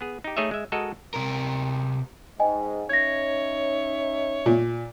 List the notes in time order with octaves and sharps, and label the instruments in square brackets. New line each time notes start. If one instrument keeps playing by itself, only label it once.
[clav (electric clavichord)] B3 G#4
D#4 G4
A3 D#4 G#4 C#5 D#5 E5
G#3 E5
G#3 F#4 A4 A#4 D#5
[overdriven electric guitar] C3 A#4
[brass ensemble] G#2 [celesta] D#5 G5 G#5
[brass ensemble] C#4 D#4 E5 [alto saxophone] C#5 [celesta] G#6 A#6
[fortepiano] A#2